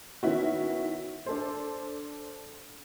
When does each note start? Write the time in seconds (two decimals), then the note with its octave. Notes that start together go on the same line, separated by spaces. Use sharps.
0.23 D#3 B3 C#4 E4 F#4
1.26 D4 A4 C5